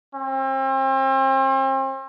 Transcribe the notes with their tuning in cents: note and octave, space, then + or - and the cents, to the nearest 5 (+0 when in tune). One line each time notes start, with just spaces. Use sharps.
C4 +40